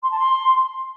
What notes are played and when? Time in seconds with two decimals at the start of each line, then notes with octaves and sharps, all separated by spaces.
0.03 C6
0.11 A5
0.19 C6